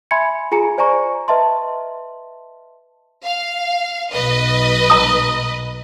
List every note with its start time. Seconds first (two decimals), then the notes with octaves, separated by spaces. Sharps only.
0.11 E5 G#5 B5 C6 G#6 C#7
0.52 F4 G#4 G#5 A#5 C#7
0.78 C5 D5 G#5 A#5 C#6
1.28 B4 D#5 E5 A5 C6
3.24 F5
4.13 B1 B4 D#5
4.90 A#5 D#6